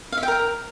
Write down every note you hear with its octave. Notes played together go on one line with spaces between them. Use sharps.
F5
E5
G5
A#4